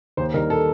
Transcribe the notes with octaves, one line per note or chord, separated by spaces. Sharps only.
D#2 C5
D#3 G3 A#4
A4